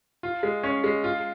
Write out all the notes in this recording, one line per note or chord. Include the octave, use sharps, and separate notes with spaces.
F4
G#3
C#4
G#3
F4